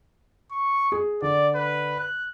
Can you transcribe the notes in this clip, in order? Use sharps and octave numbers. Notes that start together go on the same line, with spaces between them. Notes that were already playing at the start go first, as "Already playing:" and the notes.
C#6
G#4
D3 D5
B4
F#6